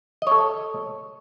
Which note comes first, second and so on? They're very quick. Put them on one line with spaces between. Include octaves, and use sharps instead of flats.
D#5 C#5 A4